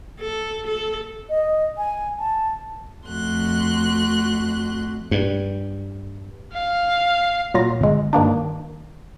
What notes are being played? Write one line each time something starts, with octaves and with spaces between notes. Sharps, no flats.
A4
A4
D#5
G#5
A5
F2 A3 F#4 C6 F#6
G2
F5
A#2 F#3 F4 A#6
G1 G#3
G2 D#3 A#3 D4